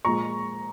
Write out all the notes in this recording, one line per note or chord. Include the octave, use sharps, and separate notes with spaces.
A#2 F3 G#3 A#5 C#6